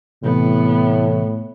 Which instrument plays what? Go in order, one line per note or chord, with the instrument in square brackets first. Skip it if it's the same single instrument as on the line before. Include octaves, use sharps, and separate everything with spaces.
[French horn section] A2 [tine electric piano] C3 E3 A3 [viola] B3